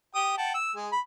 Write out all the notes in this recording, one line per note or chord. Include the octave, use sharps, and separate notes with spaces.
G4 G5 D#6
F#5 G5 A5
E6
G#3 G#4
B5